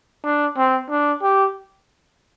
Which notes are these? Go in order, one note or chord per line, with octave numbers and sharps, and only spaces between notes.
D4
C4
D4
G4